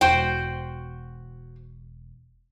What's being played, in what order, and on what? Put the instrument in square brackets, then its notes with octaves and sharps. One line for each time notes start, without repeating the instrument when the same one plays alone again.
[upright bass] E1 [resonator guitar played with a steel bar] F#4 C5 G5